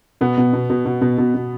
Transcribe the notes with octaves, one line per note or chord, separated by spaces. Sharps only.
B2 B3
B2
B2
B2
B2
B2
B2
B2